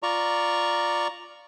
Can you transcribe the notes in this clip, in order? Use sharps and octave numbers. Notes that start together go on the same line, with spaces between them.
F4 D5 A#5 C#6